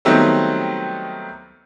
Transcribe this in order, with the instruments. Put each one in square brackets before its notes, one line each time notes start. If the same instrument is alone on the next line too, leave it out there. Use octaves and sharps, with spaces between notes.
[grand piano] D#3 F#3 G3 A3 B3 C4